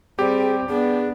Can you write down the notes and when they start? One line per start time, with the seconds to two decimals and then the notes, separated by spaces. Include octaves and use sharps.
0.19 G3 C4 G4 G#4
0.69 B3 D4 G#4